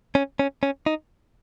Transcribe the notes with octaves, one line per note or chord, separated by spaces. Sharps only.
C#4
C#4
C#4
D#4